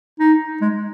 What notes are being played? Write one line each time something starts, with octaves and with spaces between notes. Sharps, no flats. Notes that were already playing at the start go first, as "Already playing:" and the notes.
D#4
G#3